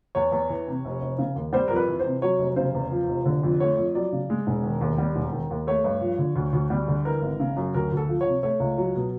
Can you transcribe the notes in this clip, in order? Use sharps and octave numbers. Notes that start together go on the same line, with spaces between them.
E2 C#5
E2
E3
C3
F1
F1
C#3
D#2
G3 C5
F2 A#4
B4
E3
C5
C3
F#3 C#5
F1
C#3 C5
E2
F3
F1
D3
F2
A3 C#5
F2
F#3 D5
C#3
G#3
E1
D#3
D#2
G3
E1
D#3
D#2
A3 C#5
G2
F3
D3
D2
D2
G3
D3
E3 A#4
G#1
C#3
F#2
D2 A#4
D2
A4
F3
C#5
C3
A3 C#5
C#2
F#3
B2